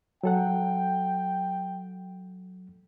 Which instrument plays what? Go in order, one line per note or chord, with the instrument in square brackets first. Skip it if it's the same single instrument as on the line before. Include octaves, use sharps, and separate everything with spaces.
[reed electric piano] F#3 A4 F#5 [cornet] G5